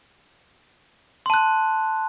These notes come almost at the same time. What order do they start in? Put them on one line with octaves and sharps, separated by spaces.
C6 A5 F#6